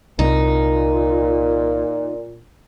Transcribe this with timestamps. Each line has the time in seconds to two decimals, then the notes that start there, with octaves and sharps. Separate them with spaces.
0.19 C2 A#2 D#4